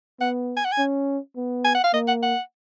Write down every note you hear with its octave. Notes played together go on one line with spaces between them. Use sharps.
B3 F#5
G#5
F#5
G#5
C#4
B3
G#5
F#5
F5
A#3 D#5
F#5
F#5